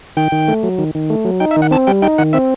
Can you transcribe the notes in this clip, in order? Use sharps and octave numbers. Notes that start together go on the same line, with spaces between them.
D#3 G5
D#3
A3
F#3
D#3
D#3
A3
F#3
D#4 G5
E5
D#3
F#5
C4 A5
G3 G5
D#4 G5
D#3 F#5
C4 E5